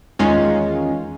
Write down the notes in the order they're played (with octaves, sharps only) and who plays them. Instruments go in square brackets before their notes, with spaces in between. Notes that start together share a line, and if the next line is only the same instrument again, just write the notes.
[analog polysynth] E2 D#3 G#3 C#4 D#4 F4